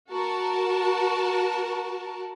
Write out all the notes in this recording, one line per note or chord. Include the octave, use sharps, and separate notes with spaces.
F#4 A#4 A5